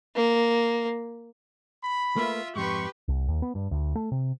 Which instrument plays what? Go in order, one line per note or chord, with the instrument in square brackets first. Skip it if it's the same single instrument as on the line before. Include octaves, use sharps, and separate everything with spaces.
[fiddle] A#3
[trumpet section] B5
[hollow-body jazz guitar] A3 A#3 B4 [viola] F4 E5
[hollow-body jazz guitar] F2 G#2 [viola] G4 B4 [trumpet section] C6 C#6
[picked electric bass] C2
D#2
B3
G2
D2
A3
C3